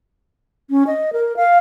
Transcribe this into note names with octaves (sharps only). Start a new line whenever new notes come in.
C#4
D#5
A#4
F5